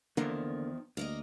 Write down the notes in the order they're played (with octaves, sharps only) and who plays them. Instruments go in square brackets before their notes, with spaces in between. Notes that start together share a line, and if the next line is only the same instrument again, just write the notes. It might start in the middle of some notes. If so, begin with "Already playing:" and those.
[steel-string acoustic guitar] E2 D#3 F3 [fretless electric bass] D3 A#3
[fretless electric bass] D2 [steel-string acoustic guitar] A#3 A#4 D#5